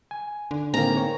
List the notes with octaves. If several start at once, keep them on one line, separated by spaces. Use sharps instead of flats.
G#5
D3
A2 D#3 G#3 A#3 C4 A#5
C#5